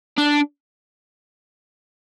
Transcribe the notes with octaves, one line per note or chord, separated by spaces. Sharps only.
D4